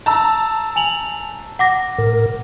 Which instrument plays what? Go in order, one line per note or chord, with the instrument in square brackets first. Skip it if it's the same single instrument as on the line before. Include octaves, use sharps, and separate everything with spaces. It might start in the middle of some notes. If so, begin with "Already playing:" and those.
[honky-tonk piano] A5 A#5 E6
[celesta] G#5 F7 F#7
F#5 D6 A#6
[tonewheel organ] A2 A#4